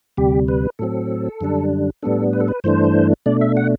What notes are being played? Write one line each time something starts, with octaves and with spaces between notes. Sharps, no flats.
D2 C3 G3 G4
B4
A2 F#3 C4 A4
F#2 D3 G3 D4
A2 G3 B3 D4 A4
B4
A4
B4
G2 E3 A3 D4 C5
B2 A3 D4 D5
E5
F#5